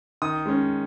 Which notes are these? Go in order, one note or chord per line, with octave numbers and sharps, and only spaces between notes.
D#3 D#6
G#3 C#4